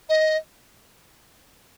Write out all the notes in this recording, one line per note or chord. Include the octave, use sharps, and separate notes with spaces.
D#5